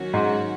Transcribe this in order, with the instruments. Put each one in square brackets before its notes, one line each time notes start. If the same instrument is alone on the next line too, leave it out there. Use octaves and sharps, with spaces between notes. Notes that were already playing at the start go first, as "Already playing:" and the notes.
Already playing: [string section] D#3 F#3 A#3 C#4 F#4
[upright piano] G#2